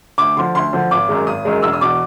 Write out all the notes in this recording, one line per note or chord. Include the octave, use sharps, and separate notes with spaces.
D2 D6
D3 F3 C6
D2 C6
D3 F3
G#1 D6
F#2 D#3 G#3
G#1 D#6
F#2 D#3 G#3
E1 E6
D#6
E2 B2 D6